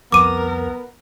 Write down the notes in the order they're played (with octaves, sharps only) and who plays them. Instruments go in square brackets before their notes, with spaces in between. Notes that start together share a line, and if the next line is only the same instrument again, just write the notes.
[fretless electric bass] C2 F2 F3 [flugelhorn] B3 [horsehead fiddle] A#4 [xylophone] D6 D#7